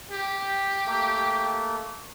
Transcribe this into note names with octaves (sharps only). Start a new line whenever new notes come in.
G4
A3 A#3